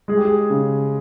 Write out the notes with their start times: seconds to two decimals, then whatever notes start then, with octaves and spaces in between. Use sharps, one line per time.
0.08 G#3 G#4
0.17 G4
0.25 G#4
0.50 C#3